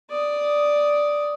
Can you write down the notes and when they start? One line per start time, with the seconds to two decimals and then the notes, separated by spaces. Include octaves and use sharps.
0.11 D5 D#6